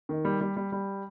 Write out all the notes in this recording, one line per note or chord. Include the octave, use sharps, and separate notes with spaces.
D#3
G3
G3
G3
G3